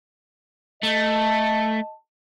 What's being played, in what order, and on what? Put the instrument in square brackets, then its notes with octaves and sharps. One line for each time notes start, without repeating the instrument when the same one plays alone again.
[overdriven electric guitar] A3 [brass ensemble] D#5 A5